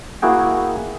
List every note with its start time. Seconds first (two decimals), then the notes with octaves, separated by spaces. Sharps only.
0.22 A#3 E4 F#4 G#4 G5